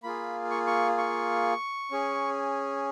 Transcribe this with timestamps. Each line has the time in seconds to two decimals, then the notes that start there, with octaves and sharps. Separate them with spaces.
0.03 A#3 F4 G#4 B5
0.51 C#6
0.67 C#6
0.98 C#6
1.91 C#4 G#4